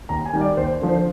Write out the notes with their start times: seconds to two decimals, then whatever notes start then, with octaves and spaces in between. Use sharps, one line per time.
0.09 D#2 A#5
0.25 G#5
0.33 D#3 G3
0.41 D5
0.57 D#2 C5
0.81 D3 F3
0.89 C5